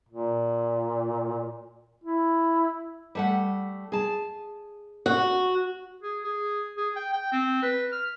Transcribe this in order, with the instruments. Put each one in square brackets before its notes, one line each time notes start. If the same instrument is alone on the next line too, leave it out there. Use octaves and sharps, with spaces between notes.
[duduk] A#2
E4
[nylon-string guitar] G3 A3 F#5
G#4 A5
[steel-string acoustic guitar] F#4
[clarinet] G#4
G#4
G#4
G5
G5
C4
B4
F6